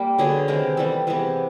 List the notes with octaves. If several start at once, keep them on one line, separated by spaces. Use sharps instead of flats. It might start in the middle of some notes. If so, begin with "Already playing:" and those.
Already playing: G3 A#3 G4
D3 F#3 B3 G#4
C3 D#3 G#3 B3 A#4
E3 G3 B3 A4
C3 E3 G#3 B3